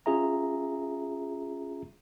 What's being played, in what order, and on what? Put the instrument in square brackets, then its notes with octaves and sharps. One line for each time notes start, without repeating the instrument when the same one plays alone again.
[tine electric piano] C#4 F4 G#4 E5 A#5